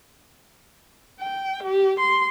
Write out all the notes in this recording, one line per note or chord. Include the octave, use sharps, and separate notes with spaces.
G5
G4
C6